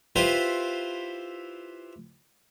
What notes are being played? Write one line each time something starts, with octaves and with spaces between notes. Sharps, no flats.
E4 F4 G4 B4 C5